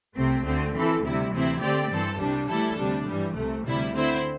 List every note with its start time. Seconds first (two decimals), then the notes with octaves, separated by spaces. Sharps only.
0.16 C2 C3 A3 C4
0.45 D2 D3 A3 C4
0.74 E3 C4 E4 A4
1.03 D2 C3 G3 E4
1.32 D2 C3 E3 C4 E4
1.61 D3 A3 C4 G4 D5
1.90 G2 E3 C4 A4
2.19 C2 C3 G3 D4
2.48 A2 E3 G3 E4 A4
2.78 D2 C3 G3 D4
3.07 G2 E3 G3
3.36 C2 C3 A3
3.65 D2 C3 G3 E4
3.94 D3 C4 E4 C5